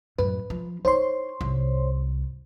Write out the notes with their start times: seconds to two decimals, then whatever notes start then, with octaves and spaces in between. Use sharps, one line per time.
0.18 F#2 A2 B4
0.50 F3
0.85 D#4 E4 C5 C#5 C6
1.41 C2 G#2